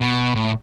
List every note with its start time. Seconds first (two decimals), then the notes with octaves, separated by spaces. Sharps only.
0.01 B2
0.35 A2